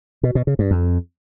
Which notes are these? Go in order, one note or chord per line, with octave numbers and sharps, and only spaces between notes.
B2
B2
C#3
G2
F2